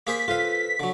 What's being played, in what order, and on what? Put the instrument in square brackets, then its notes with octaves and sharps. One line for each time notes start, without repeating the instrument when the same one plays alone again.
[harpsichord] A#3 G#4 C5 [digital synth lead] B6
[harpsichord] F4 F5 [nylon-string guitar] A4 B4 C5
[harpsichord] D3 F#3